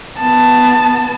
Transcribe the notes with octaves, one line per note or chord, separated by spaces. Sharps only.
B3 A5